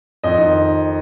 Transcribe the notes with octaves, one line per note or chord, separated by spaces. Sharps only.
F2 D#5
D#3